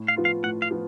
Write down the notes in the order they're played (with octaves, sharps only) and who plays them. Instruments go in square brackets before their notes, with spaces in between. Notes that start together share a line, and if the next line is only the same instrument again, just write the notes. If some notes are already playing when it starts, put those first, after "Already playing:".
Already playing: [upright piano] A2
[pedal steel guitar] F5
[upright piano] F3 B3 F4
[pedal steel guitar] F5
[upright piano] A2 [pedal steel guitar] F#5
[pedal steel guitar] F5
[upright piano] F3 B3